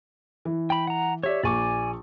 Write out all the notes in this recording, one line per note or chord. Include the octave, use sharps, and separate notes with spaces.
E3
G5 B5
F#5 A#5
G4 C#5 D5 E5
A#1 D5 G#5 C#6 D6